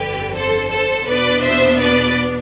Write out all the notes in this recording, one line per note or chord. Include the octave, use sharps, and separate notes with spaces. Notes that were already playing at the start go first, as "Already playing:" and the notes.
Already playing: G1 F2 D3 G4 B4
A4 C5
A4 C5
E2 B2 B3 D4 B4 D5
C5 E5
B4 D5